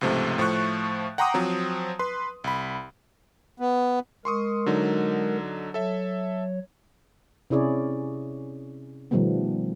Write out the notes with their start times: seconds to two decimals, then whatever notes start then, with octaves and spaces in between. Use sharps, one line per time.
0.01 C#2 G#2 C3 F3 A3
0.38 A2 F3 A3 C#6 F#6
1.18 F#5 G5 A#5 C6 D6 D#6
1.34 F3 F#3 C4
1.99 B4 C6
2.44 C2 B5
3.60 B3
4.25 G#3 A#4 C6 C#6 D#6
4.66 D3 F#3 D#4
5.74 F#3 A4 C#5 E5
7.50 C3 C#4 E4 G#4 C#5 D5
9.11 B2 D#3 F3 G3 A3 B3